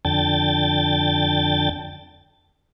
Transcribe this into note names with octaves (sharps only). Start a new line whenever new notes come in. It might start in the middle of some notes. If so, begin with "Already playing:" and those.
F2 D3 G5 A5 A6